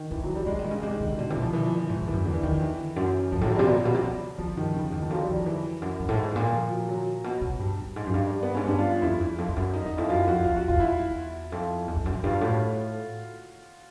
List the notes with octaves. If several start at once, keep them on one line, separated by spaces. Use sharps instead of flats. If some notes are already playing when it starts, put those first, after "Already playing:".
Already playing: D#3
D3 E3
F#3
E3
G3
E3 G#3
D#3
G#3
C#3
C3 G#3
D#3
C3
D3
B2 D3
C3 E3
B2
F3
E3
F3
E3
G#2
G2
E3
F#2
E2 D3
E3
E2 D#3
E3
F#2
G2 F3
A2 F#3
G#2
G3
C3
B2 F#3
A#2
B2
C3
C#3
C#3 F3
G2 D#3
F2 C#3
E2 D#3
F3
F2 F#3
G3
F2
F3
E3
F#2
G2
A2
G#2
A#2
F3
F#3
F#3
B2
C3
G2
G2
G#2
F#2
G2
G3
B3
G#2 C#4
G2 D4
F4
F4
F2 E4
E2
F2
F2
F#2
D#4
E2 D#4
F2 E4
F#2 F4
F2 F#4
E2 F4
E2 F#4
F2 F4
E2 E4
E2
F2
E2
F2
F#2
F2
G2 F4
A2 F#4